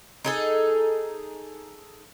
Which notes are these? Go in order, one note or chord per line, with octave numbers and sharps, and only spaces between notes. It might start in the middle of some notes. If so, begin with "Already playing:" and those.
D#4 G#4 A4